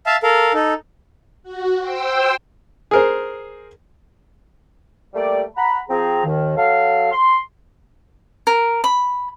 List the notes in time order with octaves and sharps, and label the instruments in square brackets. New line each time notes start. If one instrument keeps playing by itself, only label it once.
[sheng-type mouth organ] E5 F5 A5
A4 A#4 F5
D#4 A4
[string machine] F#4
C5 G5 E6
[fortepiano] G#4 A#4 C5
[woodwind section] G3 A3 A#3 G4 D5
F#5 A#5 B5
F3 C4 G#4 A#5
D#2 D#3
F#3 A4 F5
C6
[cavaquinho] A#4
B5